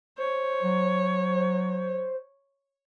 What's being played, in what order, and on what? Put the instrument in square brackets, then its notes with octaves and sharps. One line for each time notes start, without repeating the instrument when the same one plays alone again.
[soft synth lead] C5 [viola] C#5
[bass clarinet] F#3